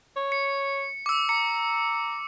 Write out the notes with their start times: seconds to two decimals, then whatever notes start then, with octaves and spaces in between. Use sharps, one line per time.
0.17 C#5
0.32 C#7
1.06 D6 E6
1.29 A#5 C#7